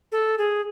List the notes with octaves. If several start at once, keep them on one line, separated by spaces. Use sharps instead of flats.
A4
G#4